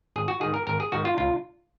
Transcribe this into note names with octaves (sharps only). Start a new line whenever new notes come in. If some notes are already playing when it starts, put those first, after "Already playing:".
G#1 G#4
F#4
G#2 D#3 G#4
A#4
G#1 A#4
G#4
G#2 D#3 F#4
F4
C#2 F4